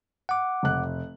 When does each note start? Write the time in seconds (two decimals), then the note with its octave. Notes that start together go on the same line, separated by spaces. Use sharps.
0.29 F#5 D6
0.63 F1 F#6